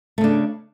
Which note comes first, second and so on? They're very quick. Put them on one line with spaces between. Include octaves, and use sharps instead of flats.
A3 C#3 D4